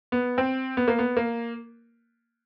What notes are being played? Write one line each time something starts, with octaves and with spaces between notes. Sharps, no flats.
B3
C4
B3
A#3
B3
A#3